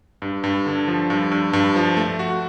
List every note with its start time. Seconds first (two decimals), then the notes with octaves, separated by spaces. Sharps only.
0.22 G2
0.44 G2
0.66 D3
0.88 F3
1.10 G2
1.32 G2
1.53 G2
1.76 F3
1.97 A3
2.19 F#4